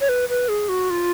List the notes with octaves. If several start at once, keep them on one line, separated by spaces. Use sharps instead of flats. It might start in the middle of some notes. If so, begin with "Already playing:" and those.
C#5
B4
B4
G#4
F#4
F4